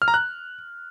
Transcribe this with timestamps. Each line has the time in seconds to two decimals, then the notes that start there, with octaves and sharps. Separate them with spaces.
0.02 F6
0.08 A#5
0.14 F#6